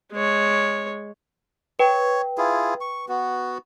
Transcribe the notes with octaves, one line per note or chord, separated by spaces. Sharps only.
G#3 C#5
B4 C#5 G5
E4 F4 G#4
C#6
B3 F#4